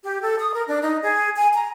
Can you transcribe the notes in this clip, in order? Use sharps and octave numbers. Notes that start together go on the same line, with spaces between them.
G4
A4
D#6
A#4
D4
D#4
G#4
G#5
A#5